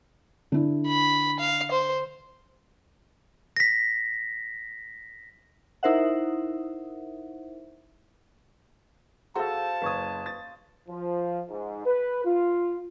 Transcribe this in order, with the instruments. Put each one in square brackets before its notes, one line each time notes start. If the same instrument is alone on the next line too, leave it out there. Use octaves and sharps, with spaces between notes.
[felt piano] D3 E4
[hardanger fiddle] B5
F5
C5
[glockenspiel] A#6 B6
[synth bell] D#4 E4 A#4 C5 E5 F#5
[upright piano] F#4 A4 [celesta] G#4 E6 [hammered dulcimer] C5 F5 [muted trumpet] A5
[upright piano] F#1 D#6 [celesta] B4 C#6 G#6
[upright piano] A6
[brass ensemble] F3
G#2
B4
F4